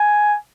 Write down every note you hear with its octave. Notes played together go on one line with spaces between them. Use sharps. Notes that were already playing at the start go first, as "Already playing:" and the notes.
Already playing: G#5